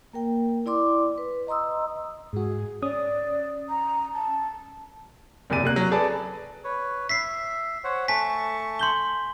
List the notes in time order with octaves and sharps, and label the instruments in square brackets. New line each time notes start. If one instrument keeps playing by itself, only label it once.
[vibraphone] A#3 A#4 G5
E4 D5 C6 D6
B4
D#5 A#5 C6 D#6 E6
[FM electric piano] G#2 F#4 [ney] G#4
[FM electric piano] C#4 D#6 [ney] D5
[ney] A#5
A5
[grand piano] F#1 E2 C3 D5 D#7
C3 A#3 F#6
F#3
G#4 A4 B4 D5 G#5 A5
[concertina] B4 C#5
[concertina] E5 [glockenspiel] B6 C7
[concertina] C5 C#5 F#5
[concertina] A3 A5 C#6 [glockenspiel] G#5 B6
[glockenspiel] C6 G6 G7